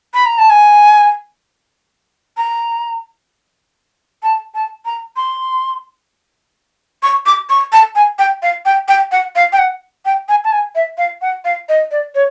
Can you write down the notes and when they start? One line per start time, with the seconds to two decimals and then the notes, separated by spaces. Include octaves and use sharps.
0.14 B5
0.26 A#5
0.38 A5
0.50 G#5
2.37 A#5
4.23 A5
4.55 A5
4.85 A#5
5.16 C6
7.03 C#6
7.26 D6
7.50 C#6
7.73 A5
7.95 G#5
8.19 G5
8.43 F5
8.65 G5
8.88 G5
9.12 F#5
9.36 F5
9.53 G5
9.59 F#5
10.05 G5
10.29 G#5
10.44 A5
10.52 G#5
10.75 E5
10.98 F5
11.22 F#5
11.45 F5
11.69 D#5
11.91 D5
12.15 C#5